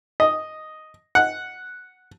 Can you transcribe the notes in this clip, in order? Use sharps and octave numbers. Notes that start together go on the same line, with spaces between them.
D#5
F#5